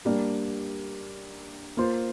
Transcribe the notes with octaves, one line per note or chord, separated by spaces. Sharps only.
G3 A#3 D4 G4
A#3 F4 C5